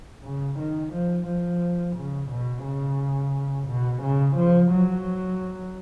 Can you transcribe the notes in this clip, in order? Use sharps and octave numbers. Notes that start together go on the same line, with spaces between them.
C#3
D#3
F3
F3
C#3
B2
C#3
B2
C#3
F3
F#3